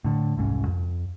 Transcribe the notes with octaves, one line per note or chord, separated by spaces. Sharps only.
A2 D3
E1 C2 G#2 C#4
F2